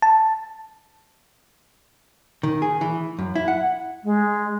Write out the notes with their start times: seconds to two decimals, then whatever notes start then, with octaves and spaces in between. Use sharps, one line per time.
0.02 A5
2.43 D#3
2.62 G#4
2.81 E3
3.19 F#2
3.36 E4
3.48 F#5
4.04 G#3